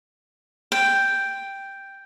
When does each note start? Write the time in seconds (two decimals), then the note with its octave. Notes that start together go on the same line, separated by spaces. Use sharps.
0.72 G5